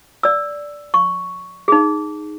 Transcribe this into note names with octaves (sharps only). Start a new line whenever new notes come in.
D5 E6
C#6
D#4 G#4